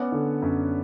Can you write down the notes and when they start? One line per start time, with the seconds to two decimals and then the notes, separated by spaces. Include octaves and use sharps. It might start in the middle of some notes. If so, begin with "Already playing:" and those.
Already playing: B3 C#4 D5 F#5
0.12 D3
0.42 F#2